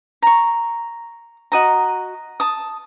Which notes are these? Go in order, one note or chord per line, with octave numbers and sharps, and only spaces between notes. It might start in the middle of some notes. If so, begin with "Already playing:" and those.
A#5 C#6
F#4 D#5 A#5
A5 D#6